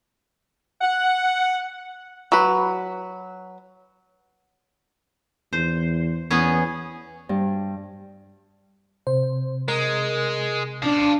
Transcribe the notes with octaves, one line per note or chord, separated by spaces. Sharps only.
F#5
F#3 B4
E2 C5
E2 B3 C#4 G#4
G2
C3 C5
G#3 A#4
D4 F5 A5